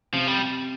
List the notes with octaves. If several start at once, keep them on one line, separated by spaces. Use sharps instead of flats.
C3 F3
G3